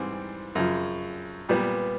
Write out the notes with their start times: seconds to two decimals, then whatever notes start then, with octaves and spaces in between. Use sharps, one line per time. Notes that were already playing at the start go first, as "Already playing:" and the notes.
Already playing: G#2 E3 G3 C4
0.55 F#2 C#3 F3
1.49 A#2 G3 B3